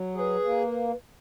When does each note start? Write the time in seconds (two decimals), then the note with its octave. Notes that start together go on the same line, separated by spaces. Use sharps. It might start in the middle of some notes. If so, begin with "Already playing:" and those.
Already playing: F#3
0.15 G#4 C#5
0.19 B4
0.44 A#3